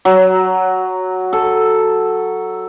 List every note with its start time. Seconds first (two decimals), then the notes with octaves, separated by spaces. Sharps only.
0.05 F#3
1.33 A4